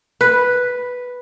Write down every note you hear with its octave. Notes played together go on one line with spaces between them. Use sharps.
B4